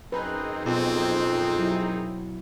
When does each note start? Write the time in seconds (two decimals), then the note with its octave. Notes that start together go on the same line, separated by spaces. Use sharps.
0.12 F#2 C4 D#4 G#4 B4
0.65 F2 B2 C4
1.58 F#3 E4